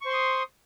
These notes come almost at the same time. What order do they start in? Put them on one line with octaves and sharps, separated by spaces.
C#6 C5 C6 D#6